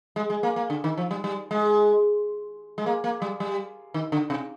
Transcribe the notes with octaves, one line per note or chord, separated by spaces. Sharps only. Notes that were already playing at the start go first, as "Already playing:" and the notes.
G#3
G#3
A#3
A#3
D3
D#3
F3
G3
G3
G#3
G#3
A#3
A#3
G3
G3
D#3
D3
C3